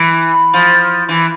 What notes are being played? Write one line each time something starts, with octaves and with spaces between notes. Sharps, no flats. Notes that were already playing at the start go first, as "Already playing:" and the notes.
Already playing: E3
F3
E3